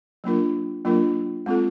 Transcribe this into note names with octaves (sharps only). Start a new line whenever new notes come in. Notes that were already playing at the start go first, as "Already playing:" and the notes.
F#3 A#3 D4 F4 A#4
F#3 A#3 D4 F4 A#4
G#3 C4 F4 A4